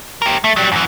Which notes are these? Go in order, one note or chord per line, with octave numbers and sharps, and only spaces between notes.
G4 A#4
A3
F#3 G3
F#2 E3